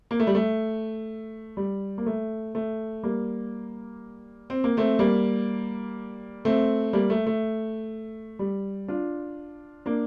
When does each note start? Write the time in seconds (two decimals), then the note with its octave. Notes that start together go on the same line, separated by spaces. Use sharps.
0.11 A#3
0.20 A3
0.27 G3
0.35 A3
1.57 G3
1.98 A#3
2.06 A3
2.55 A3
3.03 G3 A#3
4.50 C4
4.64 A#3
4.77 A3 C4
4.99 G3 A#3
6.45 A3 C4
6.93 G3 A#3
7.10 A3
7.27 A3
8.39 G3
8.88 D4 F4
9.86 A#3 D4